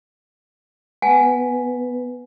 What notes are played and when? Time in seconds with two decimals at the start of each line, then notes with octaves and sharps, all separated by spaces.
1.02 B3 B4 F#5 G#5 A5